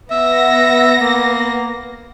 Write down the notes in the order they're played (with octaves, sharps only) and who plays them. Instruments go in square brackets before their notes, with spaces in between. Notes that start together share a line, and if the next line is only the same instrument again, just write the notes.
[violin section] B3 A#6 [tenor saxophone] E5
[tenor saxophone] A#3